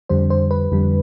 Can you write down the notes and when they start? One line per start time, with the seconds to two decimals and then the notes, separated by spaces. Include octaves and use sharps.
0.09 F2 D3 G3 C5
0.30 C5
0.51 B4
0.72 F2 D3 G3